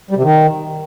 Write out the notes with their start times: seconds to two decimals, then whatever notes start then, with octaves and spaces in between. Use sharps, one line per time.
0.11 G3
0.17 C3
0.23 D#3